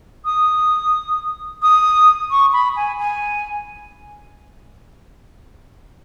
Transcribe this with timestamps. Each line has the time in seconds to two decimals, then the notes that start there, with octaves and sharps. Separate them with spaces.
0.25 D#6
1.62 D#6
2.30 C#6
2.53 B5
2.76 G#5
2.99 G#5